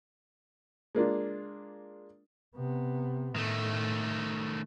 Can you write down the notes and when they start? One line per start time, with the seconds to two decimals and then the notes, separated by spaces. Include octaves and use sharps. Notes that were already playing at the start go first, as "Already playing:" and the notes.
0.95 G#3 A#3 D4 F4
2.56 C3 B3
3.36 A2 D#3 A3